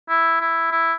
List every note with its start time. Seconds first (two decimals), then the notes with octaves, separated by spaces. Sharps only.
0.09 E4
0.41 E4
0.71 E4